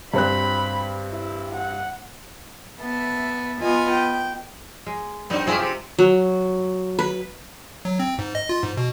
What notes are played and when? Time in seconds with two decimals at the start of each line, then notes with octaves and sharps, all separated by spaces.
0.14 G2 C4 B5 F#6
1.12 E4
1.55 F#5
2.79 B3 E5 A5
3.61 B3 F4 D#5 G#5
3.91 G5
4.86 G#3
5.30 F#3 B3 C4 D4 D#4
5.47 G2 G#3 C4 E4 F4 G#4
5.59 C3 G4
5.99 F#3
6.99 B4
7.85 F#3
7.99 C4
8.19 G#2
8.35 D#5
8.49 F4
8.63 G#2
8.77 B2